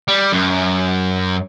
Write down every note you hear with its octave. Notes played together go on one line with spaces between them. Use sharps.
G3
F#2